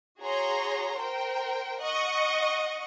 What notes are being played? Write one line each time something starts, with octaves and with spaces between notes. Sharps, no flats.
F#4 G#4 C#5 A#5 C6
A#4 C5 G5
D#5 F#5 C#6